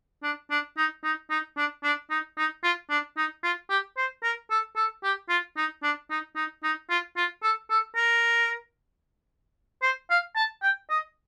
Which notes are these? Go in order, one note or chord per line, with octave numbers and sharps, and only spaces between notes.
D4
D4
D#4
D#4
D#4
D4
D4
D#4
D#4
F4
D4
D#4
F4
G4
C5
A#4
A4
A4
G4
F4
D#4
D4
D#4
D#4
D#4
F4
F4
A4
A4
A#4
C5
F5
A5
G5
D#5